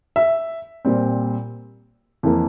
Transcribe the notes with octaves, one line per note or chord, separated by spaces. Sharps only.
E5
A#2 G3 C4
F2 E3 A#3